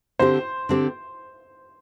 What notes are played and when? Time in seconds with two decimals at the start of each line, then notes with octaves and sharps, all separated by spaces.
0.19 D3 C4 G4 C5
0.69 D3 C4 G4